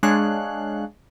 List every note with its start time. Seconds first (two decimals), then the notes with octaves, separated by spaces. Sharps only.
0.03 G#3 D4 G#4 C#5 F5 F#6